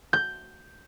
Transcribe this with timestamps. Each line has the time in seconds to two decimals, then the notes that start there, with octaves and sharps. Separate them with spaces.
0.13 G6